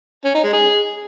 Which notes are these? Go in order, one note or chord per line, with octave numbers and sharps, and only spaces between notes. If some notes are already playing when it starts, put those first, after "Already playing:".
C#4
D#4
G#3
G#4